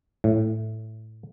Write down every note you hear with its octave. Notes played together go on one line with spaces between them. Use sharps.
A2